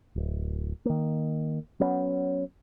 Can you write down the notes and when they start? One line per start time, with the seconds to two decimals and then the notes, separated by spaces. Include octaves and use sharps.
0.16 D1
0.85 D#3 A#3
1.80 F#3 B3 C#4